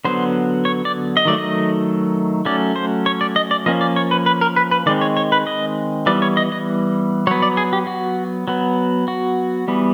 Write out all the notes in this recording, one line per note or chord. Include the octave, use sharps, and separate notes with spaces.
D3 F#3 B3 C5
C#5
D5
D#5
D#3 F#3 A3 D5
D#5
F#3 A3 C#4 D5
C5
C#5
D5
D#5
D5
F3 A#3 C#4 D#5
D5
C#5
B4
B4
A#4
B4
B4
D#3 G#3 C4 D5
C#5
C#5
B4
D#5
E3 G3 B3 D5
C#5
D#5
D#5
F#3 B3 C#5
D5
G#4
G4
F#4
F#3 B3
F#4
E3 G3 B3